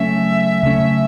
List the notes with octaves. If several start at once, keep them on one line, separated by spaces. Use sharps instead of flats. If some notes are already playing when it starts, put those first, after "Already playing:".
Already playing: C#3 F#3 A3 C#4 E5
C#3 F#3 A3 C#4